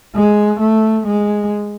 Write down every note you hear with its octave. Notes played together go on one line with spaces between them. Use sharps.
G#3
A3
G#3